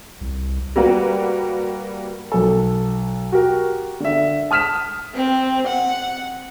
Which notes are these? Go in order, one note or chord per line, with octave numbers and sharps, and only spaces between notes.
C2
G3 A#3 F#4 B4
B1 A4
F#4 G4 A#4
D3 E5
A5 D#6 F6 B6 E7
C4
F#5